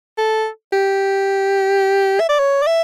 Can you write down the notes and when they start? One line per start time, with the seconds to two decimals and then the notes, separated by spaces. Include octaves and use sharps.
0.18 A4
0.72 G4
2.20 E5
2.29 D5
2.39 C#5
2.62 D5
2.67 E5